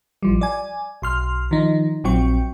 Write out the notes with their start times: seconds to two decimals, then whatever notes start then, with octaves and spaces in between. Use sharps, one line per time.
0.23 A1 F3 G3
0.41 D5 G#5
1.02 B1 C6 F6
1.51 D#3 F3 D#4
2.04 A#1 F#3 C4 G5 C#6